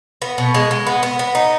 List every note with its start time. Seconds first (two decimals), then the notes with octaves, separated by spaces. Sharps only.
0.22 B3
0.38 B2
0.54 G#3
0.71 G#3
0.87 B3
1.03 B3
1.19 B3
1.35 D#4